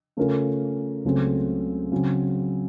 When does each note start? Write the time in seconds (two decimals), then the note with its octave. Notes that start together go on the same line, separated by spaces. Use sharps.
0.17 C#3 A3 C#4 F4 A#4
1.05 C#2 C#3 F#3 A3 C4
1.92 C#3 F#3 C4